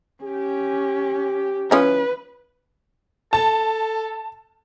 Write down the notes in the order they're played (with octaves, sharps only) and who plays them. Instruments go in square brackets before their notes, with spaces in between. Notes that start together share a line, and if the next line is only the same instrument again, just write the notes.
[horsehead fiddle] C#4 [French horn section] G4
[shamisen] F3 C#4 E4 [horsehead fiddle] B4
[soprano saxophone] A4 [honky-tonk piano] A5